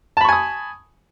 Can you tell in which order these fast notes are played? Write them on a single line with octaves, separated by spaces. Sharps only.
A5 B5 C#6 G#5 D#6